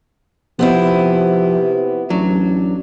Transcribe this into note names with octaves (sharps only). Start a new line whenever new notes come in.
C3 F3 B3 C4 E4
A1 F#3 D4